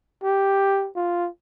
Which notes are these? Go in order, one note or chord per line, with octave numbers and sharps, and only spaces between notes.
G4
F4